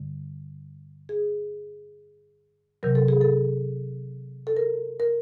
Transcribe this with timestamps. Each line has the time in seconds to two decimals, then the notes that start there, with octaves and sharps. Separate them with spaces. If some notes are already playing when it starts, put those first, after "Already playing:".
Already playing: G2 D3 G3
1.09 G#4
2.83 C3 D#3 F#3 A#4
2.95 A4
3.08 G#4
3.21 A4
4.47 A4
4.57 A#4
5.00 A#4